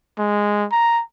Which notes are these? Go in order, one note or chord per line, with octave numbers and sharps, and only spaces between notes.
G#3
A#5